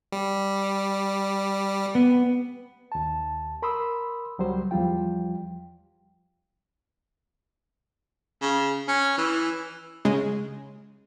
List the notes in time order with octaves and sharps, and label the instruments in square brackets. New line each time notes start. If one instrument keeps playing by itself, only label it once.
[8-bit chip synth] G3
[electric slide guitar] B3
[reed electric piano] D#2 A5
A#4 B5 C6 D#6 E6
C#2 F#3 G3 C5
E2 F3 G3 F4 G5
[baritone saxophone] C#3
C#4
E3
[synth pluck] C#3 G#3